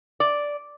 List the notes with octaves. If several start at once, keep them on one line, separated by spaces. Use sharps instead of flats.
D5